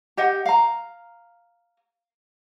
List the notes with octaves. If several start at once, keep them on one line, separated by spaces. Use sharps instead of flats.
G4 D#5 F#5
F5 A#5